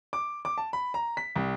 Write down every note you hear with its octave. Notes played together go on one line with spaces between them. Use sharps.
D6
D6
A5
B5
A#5
B6
C2